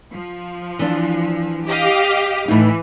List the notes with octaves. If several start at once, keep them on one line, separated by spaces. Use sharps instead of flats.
F3
E3 D4
G4 D#5 F5
A2 E3 D#4